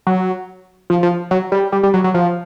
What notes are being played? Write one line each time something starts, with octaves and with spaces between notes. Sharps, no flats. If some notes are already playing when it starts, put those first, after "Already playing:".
F#3
F3
F3
F#3
G3
G3
G3
F#3
F#3
F3